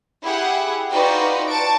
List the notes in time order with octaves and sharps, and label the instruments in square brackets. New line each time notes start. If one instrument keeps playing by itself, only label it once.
[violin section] E4 G4 G#4 F#5
D#4 F4 F#4 B4 D5 G5
A5 C#6 D7